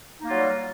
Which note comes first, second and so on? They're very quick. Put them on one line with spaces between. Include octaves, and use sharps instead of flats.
D#4 A#3 F4 F#3 G3